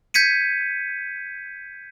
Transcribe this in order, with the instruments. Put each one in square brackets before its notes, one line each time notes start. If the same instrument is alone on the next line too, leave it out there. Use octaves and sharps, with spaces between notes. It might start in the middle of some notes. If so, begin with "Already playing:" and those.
[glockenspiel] G6 G#6 B6 C#7 D#7